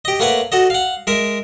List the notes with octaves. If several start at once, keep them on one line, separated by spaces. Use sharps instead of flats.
G4 D#5
A3 A#3 B4 C#5 F#5
F#4 A4 D#5
F5 F#5
G#3 A#4 E5